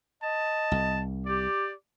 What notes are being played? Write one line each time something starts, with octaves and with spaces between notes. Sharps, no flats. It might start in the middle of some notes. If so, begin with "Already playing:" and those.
D#5 A5
C2
G4 D5